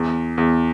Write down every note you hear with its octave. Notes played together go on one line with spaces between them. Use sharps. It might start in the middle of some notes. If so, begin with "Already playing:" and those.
Already playing: E2
E2